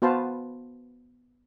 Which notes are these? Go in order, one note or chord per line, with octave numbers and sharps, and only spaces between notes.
B3 F#4 B4 C5 F5 A5